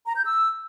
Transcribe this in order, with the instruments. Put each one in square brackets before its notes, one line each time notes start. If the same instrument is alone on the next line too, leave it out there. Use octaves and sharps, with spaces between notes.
[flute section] A#5
G6
E6